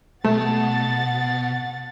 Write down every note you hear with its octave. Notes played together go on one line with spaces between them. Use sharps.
B2 A3 F#5 A5 A6